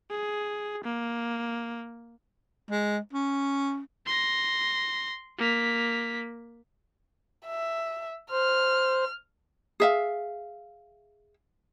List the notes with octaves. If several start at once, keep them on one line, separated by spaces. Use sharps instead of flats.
G#4
A#3
G#3
C#4
C6 A#6
A#3 B6
E5
C5 F6
G#4 E5 F5